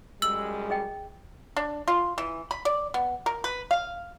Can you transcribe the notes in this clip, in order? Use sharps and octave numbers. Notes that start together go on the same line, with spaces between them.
F#2 G3 G#3 E6 F#7
G#4 D#5 G5
D4
F4
E3
B5
D5
B3
A#4
B4
F5